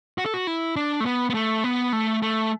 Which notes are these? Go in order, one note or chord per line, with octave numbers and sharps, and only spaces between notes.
F#4
A4
F#4
E4
D4
A3
B3
B3
A3
B3
A3
A3